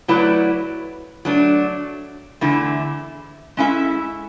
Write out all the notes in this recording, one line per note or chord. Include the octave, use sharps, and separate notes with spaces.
F#3 A3 E4 B4 D5
F#3 A3 D4
E2 D3 A3 E4
G#3 C#4 E4 A4 E5